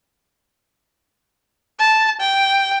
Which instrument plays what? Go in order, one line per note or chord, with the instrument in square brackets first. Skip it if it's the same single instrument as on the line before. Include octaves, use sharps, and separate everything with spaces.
[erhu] A5
G5